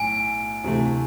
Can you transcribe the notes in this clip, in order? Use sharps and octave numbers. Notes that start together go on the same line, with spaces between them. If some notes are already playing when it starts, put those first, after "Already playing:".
Already playing: B1 A2 G#5
D2 C3 E3 A3